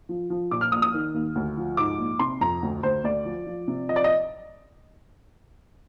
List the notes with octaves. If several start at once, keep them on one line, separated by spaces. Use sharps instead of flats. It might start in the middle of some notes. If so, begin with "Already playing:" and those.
F3
F3
A#2 D6
F6
A#1 D#6
D#6
D#3
D#2
D2
F3
G#2 D6
A#1
C3 C6
F2 A#5
D2
D2 C5
D2 D5
F3
F3
C3
F3 D#5
D5
D#5